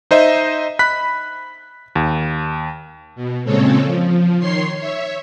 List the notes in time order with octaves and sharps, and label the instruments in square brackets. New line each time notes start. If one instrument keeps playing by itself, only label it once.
[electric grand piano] D#4 C5 D#5 E5
B5 F#6 B6
D#2
[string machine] B2
A#2 C#3 G#3 C4 A4 C#5
F3
D#3 C#5 C6 C7
C#5 E5